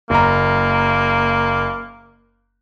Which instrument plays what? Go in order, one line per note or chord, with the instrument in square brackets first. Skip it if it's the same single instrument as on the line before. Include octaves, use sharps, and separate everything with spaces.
[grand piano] F#1 A#5 [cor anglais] A#3